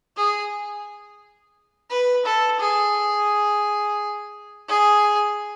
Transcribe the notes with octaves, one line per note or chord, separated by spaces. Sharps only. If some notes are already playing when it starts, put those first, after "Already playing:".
G#4
B4
A4
G#4
G#4